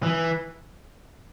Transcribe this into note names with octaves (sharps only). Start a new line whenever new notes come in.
E3